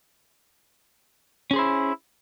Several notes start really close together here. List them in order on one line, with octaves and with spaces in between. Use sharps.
C#4 G#4 C5 E4